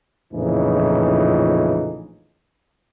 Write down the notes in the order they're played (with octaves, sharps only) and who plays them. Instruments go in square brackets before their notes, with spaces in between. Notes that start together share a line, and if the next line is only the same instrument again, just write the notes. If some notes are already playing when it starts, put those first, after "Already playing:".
[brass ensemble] A#1 F2 A2 C#3 E3 D#4